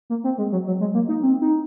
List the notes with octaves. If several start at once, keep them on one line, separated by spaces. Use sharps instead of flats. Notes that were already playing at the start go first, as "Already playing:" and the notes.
A#3
C4
G#3
F#3
F#3
G#3
A#3
D#4
C4
D#4